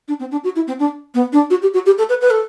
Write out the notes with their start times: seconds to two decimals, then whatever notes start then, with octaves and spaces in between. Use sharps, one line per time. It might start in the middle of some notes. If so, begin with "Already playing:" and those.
0.08 D4
0.20 C4
0.32 D4
0.44 F#4
0.56 E4
0.67 C4
0.79 D4
1.15 B3
1.33 D4
1.50 F#4
1.62 G4
1.74 F#4
1.86 G4
1.98 A4
2.09 B4
2.21 B4
2.31 A4